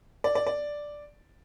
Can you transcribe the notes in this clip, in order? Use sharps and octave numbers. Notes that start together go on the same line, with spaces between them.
D5
D5
D5